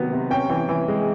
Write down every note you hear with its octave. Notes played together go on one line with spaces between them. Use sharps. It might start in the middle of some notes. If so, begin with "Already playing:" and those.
Already playing: C3 D#3 F#3 B3
C3
C#4 G5
E3
E3
G#3